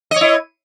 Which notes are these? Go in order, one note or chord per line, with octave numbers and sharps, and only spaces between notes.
E4 C#5 D#5